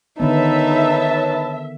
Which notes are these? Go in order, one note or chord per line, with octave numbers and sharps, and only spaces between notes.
D3 D#3 B3 D#4 B4 C#5 E5 A5